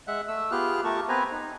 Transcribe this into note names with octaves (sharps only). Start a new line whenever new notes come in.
G#3 E5 F#5 F#6
A3 E6
B3 F4 G4 G#4 F6 F#6
A3 F4 G4 A#4 A5 C#6
B3 C4 B4 C5 G#5 A#5
D#4